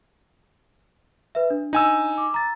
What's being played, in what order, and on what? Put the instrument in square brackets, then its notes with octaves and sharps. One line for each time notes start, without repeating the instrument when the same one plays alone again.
[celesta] B4 E5
D4
[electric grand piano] D#4 G#5 E6
[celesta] D6
A#5 A6